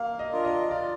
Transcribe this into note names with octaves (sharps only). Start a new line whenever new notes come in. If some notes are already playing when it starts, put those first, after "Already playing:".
Already playing: A#3 F5
D#5
D4 F4 A#4
D#5
F4 D5